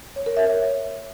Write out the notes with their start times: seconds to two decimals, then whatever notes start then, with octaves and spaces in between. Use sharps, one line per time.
0.16 C#5
0.26 A#4
0.37 E5
0.47 C#5